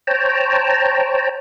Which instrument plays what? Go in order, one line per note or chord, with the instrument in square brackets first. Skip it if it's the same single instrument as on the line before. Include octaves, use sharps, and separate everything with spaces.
[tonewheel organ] C5 C#5 G5 A5 A#5